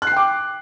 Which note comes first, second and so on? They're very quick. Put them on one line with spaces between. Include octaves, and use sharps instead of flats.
F#6 C7 G5 D6